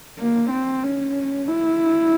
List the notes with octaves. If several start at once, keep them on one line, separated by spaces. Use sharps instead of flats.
A#3
C4
C#4
E4